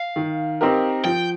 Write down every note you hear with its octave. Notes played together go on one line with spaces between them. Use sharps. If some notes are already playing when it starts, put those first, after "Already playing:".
Already playing: F5
D#3
C4 D#4 G4 A#4
F3 G5